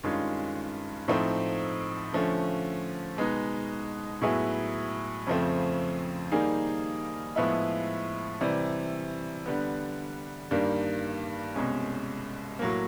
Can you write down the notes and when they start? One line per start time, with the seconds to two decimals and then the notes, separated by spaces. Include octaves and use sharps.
0.03 G2 D#3 G#3 C#4 F4
1.08 A2 F3 A3 C4 D#4
2.13 D3 F3 A3 C#4
3.17 B2 G#3 B3 D#4
4.22 A2 F#3 B3 E4 G#4
5.27 F2 C#3 F3 A3 C4
6.32 D#3 G3 A#3 D#4 G#4
7.36 A2 F3 G#3 B3 E4
8.41 C3 E3 G3
9.46 D3 G3 B3
10.51 G2 D#3 G3 A#3
11.55 C2 B2 G#3 C#4
12.59 A2 F#3 A#3